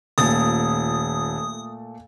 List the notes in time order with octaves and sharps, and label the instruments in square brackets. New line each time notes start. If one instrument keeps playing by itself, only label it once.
[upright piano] D#1 [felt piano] A#2 A3 A6 [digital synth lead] D#6